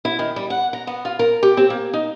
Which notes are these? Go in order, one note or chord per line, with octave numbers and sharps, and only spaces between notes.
E4
D#3
G3
F#5
A#5
B3
F4
A#4
G4
C4
A#3
D#4